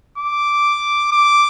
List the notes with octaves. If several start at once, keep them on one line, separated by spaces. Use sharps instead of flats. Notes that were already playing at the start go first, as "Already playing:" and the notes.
D6
D6